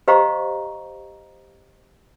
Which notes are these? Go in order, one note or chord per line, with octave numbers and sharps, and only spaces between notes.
G4 C5 D#5 F5 A#5 C#6